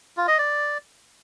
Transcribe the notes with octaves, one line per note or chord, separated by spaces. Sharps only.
F4
D#5
D5